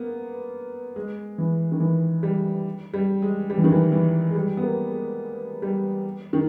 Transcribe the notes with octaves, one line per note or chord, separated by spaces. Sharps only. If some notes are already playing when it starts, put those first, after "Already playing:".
Already playing: A#3 B3
G#3
E3
D#3
E3
G3
G3
G#3
G3
E3
D#3
E3
E3
G#3
G3
B3
A#3
G#3
G3
D#3